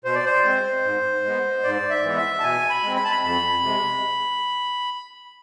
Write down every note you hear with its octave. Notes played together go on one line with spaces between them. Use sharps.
B2 C5
D5
C5
G#3 C4
G#2
G#3 B3
G#2 D5
E5
E3 G#3 B3
E5
A5
B2 G#5
B5
G#3 C4
B5
A5
B5
F2 B5
C3 G#3